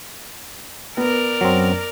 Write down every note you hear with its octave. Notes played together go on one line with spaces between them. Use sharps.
B3 A#4 D5
F#2 F#3 C4